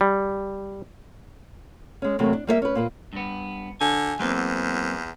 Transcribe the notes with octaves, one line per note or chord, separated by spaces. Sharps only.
G3
G#3 C#4
E2 C3 F#3 A3 A#3
D4
G3 A#3 C#5 E5
C#4 B4
A#2 A#3 B4
G2 B3
D3 G#5
E2 F#3 A#3 C4